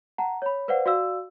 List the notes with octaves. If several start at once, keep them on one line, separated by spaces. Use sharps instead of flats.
F#5 A5 A#5
C#5 B5
B4 C5 D5 F5 F#5
F#4 D5 F5 E6